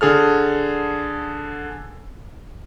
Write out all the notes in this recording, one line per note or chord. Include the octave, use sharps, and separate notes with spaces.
D3 G#4 A4 F6